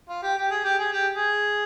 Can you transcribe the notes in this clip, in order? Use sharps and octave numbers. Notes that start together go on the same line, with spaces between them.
F4
G4
G4
G#4
G4
G#4
G4
G#4